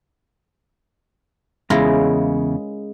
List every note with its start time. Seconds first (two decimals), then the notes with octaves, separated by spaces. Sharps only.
1.70 E2 C#3 G#3 C#4 E4 F4 G#4 A#4